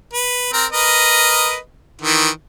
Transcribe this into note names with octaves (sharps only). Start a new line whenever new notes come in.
B4
C4 A#4
A#4 B4 D#5
D#3 E3